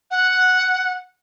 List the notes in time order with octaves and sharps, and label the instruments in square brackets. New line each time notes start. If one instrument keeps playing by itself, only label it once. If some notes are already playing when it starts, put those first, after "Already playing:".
[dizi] F#5